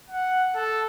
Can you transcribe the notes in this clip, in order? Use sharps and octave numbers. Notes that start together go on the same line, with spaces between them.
F#5
A4